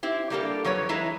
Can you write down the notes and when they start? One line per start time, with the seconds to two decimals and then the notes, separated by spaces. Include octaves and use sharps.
0.03 C4 E4 G4
0.30 G3 A3 A#3 D4 G4 A4
0.65 F2 F#3 B4 C#5
0.89 E3 G#3 E4 B4 A#5